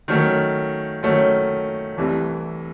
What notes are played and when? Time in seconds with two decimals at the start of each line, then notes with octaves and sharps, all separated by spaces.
0.08 D#3 F#3 A3 C#4
1.03 D#3 F#3 A3 C#4
1.96 C2 C3 E3 A3